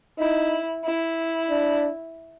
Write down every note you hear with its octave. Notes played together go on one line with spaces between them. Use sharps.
D#4 E4
E4
D4